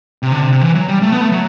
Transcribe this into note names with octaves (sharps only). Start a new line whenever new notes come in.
C3
D3
C3
C3
E3
F#3
G3
A3
B3
A3
F#3